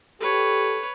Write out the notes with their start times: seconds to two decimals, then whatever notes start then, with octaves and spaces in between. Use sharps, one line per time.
0.21 G4 A4 B4 C#5